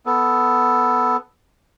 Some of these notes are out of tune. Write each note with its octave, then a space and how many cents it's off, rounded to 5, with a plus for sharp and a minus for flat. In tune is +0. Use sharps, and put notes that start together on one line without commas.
B3 +0 A4 +0